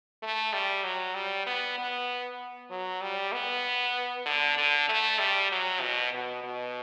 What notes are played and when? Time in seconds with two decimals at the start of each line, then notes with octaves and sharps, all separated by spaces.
0.23 A3
0.53 G3
0.84 F#3
1.15 G3
1.46 B3
1.78 B3
2.70 F#3
3.02 G3
3.33 B3
4.26 D3
4.58 D3
4.89 A3
5.19 G3
5.52 F#3
5.82 B2
6.14 B2
6.44 B2